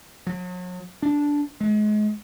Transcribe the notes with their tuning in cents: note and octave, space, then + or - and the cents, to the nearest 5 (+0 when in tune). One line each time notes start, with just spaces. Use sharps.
F#3 -40
D4 -10
G#3 +30